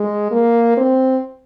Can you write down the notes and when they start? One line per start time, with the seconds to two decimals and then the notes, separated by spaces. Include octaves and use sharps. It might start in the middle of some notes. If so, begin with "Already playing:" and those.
Already playing: G#3
0.31 A#3
0.77 C4